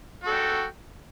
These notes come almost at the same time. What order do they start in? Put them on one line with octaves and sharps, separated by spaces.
F#4 A4 G5